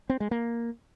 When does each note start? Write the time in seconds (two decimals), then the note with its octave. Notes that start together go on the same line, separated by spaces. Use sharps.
0.09 C4
0.20 G#3
0.31 A#3